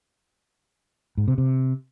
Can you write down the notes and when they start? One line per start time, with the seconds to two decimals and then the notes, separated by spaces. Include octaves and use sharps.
1.18 G#2
1.28 C3
1.38 C3